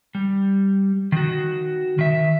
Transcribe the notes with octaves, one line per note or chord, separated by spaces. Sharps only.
G3
D#3 F#4
D#3 E5